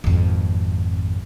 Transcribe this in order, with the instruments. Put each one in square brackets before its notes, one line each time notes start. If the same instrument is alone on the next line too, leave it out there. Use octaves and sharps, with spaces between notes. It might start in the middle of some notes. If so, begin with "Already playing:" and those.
[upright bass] G#1 F2